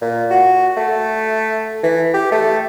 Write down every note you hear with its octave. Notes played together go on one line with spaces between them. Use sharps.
A#2
F#4
A3
E3
G4
A3